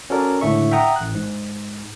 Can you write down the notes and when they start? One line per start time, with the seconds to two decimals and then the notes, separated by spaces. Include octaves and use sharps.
0.10 C#4 F#4 A4 A#4 D5
0.41 C#2 A2 D3 E5 C#6
0.71 E5 F#5 G5 A#5 D#6
0.96 A1 F#6
1.14 G#2